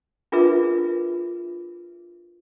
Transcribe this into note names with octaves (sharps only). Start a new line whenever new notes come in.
D4 F4 G#4 A#4 B4 E5